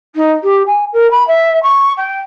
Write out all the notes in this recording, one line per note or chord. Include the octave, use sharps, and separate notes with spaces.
D#4
G4
G#5
A#4
B5
E5
C#6
G5